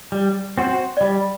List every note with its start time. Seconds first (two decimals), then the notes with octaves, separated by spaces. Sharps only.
0.12 G3
0.58 C4 F#4 C5
0.97 D5
1.01 G3 D#5